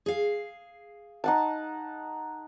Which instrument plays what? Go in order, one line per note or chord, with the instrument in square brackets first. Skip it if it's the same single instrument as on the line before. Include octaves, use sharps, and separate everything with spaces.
[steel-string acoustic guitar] G#4 F5
[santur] D#4 F#5 A5